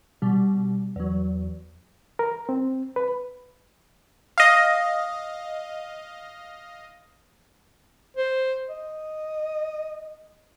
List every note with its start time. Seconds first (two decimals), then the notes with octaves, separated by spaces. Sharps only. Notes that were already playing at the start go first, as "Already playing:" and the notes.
0.22 B2 G3
0.96 E2 F#3
2.19 A#4
2.49 C4
2.96 B4
4.38 D#5 F5
8.17 C5
8.68 D#5